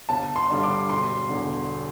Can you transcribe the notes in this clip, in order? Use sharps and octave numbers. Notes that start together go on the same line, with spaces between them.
G1 A5
C6
G2 D3 G3
D6
E1 C6
E2 D3